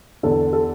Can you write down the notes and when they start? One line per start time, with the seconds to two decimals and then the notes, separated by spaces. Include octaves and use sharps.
0.23 E2 D3 A4
0.53 A4